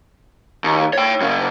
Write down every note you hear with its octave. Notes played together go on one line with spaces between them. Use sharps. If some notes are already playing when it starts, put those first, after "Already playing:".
D#2
C#5 G5
F#2 C#3